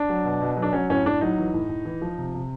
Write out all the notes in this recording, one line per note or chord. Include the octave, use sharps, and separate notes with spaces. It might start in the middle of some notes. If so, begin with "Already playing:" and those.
Already playing: D4
F#3
B2
B2
F#3
D4
F#3 C#4
A2 C#4
A2 D4
F#3 D#4
E3
A2
A2
E3
F3
C3
C3